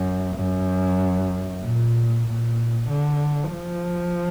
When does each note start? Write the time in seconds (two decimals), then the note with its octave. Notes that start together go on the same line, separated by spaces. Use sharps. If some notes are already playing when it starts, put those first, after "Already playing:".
Already playing: F#2
0.36 F#2
1.63 A#2
2.27 A#2
2.90 D3
3.53 F3